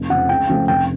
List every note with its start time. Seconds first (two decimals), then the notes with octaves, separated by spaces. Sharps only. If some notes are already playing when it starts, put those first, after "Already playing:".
Already playing: F1
0.09 F2 C#3 F#5
0.29 C#2 G5
0.49 C#3 F3 A3 C#4
0.68 F1 G5